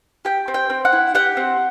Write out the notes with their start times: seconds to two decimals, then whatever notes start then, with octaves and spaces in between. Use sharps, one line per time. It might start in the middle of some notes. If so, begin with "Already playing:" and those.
0.25 G4 G5
0.48 C4
0.54 G5
0.70 C4
0.85 F#5
0.92 E4
1.15 G4 F#5
1.37 C4